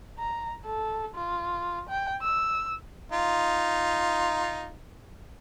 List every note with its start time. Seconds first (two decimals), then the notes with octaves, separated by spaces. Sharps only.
0.18 A#5
0.65 A4
1.15 F4
1.89 G5
2.21 E6
3.12 D#4 F4